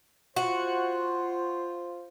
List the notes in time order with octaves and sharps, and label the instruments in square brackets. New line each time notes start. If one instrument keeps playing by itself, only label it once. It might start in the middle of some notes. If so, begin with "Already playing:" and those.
[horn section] F4 C5 [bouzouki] F#4